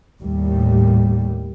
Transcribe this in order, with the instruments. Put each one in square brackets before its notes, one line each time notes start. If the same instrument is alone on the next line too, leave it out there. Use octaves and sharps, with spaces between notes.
[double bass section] D#2 A2 G3